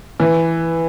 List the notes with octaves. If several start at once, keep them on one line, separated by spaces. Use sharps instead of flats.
E3